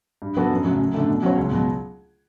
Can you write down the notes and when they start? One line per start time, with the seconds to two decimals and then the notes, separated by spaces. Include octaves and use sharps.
0.22 G2
0.36 F#3 B3 F#4 A4
0.51 F#2
0.65 C#3 F#3 A3 C#4
0.79 F#2
0.94 D3 A3
1.08 B2
1.23 F#3 C#4 F#4 C#5
1.37 C#2
1.51 B2 F#3